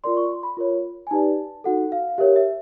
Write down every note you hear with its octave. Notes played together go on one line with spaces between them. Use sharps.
F4 A#4 D5 C6
C#6
C6
B5
F4 A#4 C#5
G#5
D#4 G4 B4 D5 A5
D#4 F#4 A4 F#5
F5
G4 A#4 C#5 E5
E5